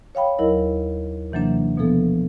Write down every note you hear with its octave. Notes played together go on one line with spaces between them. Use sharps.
C#5 F5 G5 B5
D#2 F#3 E4 A#4 D#5
C3 E3 F#3 A#3 D4
B2 F3 B3 A4